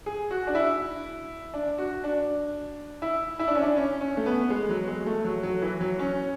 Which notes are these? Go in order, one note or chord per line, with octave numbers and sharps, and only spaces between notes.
G#4
F#4
D4
E4
D4
F#4
D4
E4
E4
D4
C#4
D4
C#4
C#4
A3
B3
G#3
F#3
G#3
A3
F#3
F#3
E3
F#3
C#4